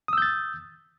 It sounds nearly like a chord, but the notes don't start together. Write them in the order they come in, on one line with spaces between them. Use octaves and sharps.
D#6 E6 G6 A6